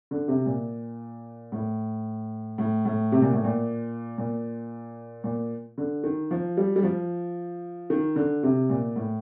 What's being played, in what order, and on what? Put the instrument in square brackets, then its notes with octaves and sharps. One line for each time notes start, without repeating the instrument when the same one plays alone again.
[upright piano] D3
C3
A#2
A2
A2
A2
C3
A#2
A2
A#2
A#2
A#2
D3
D#3
F3
G3
G3
F3
D#3
D3
C3
A#2
A2